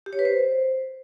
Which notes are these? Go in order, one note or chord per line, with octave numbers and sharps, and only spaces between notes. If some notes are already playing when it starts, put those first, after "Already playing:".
G4
C#5
B4
C5